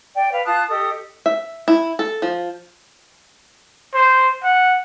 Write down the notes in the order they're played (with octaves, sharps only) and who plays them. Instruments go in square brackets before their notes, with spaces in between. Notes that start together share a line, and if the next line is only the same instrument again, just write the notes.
[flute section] D5 G5
B4 F5
F4 A5 D#6 F#6
G4 A4 D#5 D#6
[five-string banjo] E5
E4
A4
F3
[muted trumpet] C5
F#5